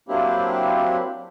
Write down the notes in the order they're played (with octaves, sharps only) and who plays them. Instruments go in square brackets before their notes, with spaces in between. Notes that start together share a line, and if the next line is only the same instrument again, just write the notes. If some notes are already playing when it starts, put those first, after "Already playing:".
[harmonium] F#3 A#3 C4 D4 E4 G4